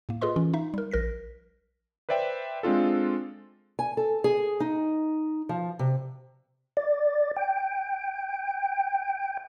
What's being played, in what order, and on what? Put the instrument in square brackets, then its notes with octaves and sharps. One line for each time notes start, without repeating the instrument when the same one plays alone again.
[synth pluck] A2 A#3
F4 G#4 A4 B4 D#5 C6
E3 C#4 F4
D#4 E5
G3 A#4
A#1 A#4 A#6 B6
[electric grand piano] B4 C5 D5 E5 G5
G#3 C4 D4 F4 A4
[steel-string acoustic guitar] G#5
A4
G#4
D#4
F3
C3
[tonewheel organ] D5
G5